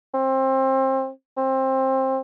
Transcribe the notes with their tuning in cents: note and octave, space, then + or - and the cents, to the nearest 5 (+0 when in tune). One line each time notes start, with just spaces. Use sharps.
C4 +25
C4 +20